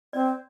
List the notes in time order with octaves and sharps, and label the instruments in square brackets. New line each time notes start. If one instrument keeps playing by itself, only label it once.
[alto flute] C4 [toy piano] D5